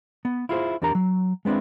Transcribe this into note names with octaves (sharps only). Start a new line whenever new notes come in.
B3
E4 F4 G#4 C5
E2 D4 G4 A#4 A#5
F#3
G#3 B3 C4 D4 E4